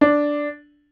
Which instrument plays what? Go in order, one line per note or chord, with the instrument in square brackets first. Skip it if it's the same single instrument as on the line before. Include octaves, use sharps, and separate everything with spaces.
[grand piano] D4